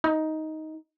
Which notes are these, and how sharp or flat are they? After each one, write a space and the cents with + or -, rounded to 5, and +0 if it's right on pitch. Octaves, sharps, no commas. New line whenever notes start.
D#4 +10